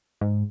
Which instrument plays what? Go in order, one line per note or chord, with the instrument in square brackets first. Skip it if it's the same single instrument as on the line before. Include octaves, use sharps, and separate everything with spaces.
[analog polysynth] G#2